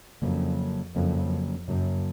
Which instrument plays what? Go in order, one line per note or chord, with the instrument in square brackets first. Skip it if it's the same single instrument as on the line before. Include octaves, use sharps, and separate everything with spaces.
[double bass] F2 [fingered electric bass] C#3 F#3 A#3
[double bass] F2 [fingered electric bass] C#3 F#3 A#3
[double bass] F#2 [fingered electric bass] C#3 F#3 A#3